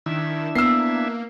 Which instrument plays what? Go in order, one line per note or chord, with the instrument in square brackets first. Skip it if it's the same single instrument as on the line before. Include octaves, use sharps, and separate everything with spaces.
[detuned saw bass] D#3 [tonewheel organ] D4 E4 E5
[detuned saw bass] A#3 [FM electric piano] B3 [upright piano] E6 C7